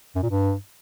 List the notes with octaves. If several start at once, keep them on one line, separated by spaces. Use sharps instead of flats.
F#2
A#2
G2